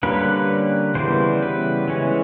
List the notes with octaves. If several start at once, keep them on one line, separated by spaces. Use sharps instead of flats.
D3 G3 A#3 C#4 B4
C#3 E3 G3 B3 C5
B4
E3 G#3 C#4